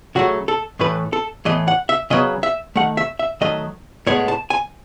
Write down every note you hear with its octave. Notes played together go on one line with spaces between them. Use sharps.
C#3 F#3 A3 F#4
A4
A2 E3 A3 B4
A4
A2 E3 B3 D#5
F#5
E5
C#3 F#3 B3 D#5
E5
D#3 A3 F#5
E5
E5
D#3 F#3 A3 D#5
A2 G#3 B3 C#5
A5
G#5